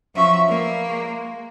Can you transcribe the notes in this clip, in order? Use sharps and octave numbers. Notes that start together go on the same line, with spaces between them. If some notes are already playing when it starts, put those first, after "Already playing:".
F3 F#3 C#4 F#4 E5
A#3 D4 A#4 B4
G#3